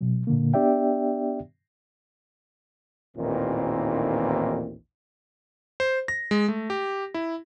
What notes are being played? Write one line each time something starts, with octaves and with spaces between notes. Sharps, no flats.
B2 F#3
A#2 D3 A#3
B3 D4 G4 D5 E5 G5
A1 D#2 A#2 D#3 E3 C4
C5
A#6
G#3
A3
G4
E4